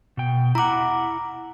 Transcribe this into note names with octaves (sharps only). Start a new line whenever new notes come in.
B2 G5
E4 F#5 A#5 D6